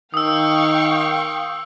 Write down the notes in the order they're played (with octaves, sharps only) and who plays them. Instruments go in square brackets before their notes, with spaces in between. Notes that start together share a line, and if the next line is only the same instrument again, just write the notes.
[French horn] D#3 [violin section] F5 G5 C#6 [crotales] D#6 E6